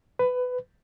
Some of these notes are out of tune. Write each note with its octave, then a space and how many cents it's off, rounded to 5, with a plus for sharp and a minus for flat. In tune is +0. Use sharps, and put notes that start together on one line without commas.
B4 +15